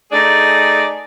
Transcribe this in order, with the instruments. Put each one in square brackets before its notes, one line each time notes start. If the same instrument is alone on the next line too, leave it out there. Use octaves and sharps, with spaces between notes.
[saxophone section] A3 D#4 G#4 D5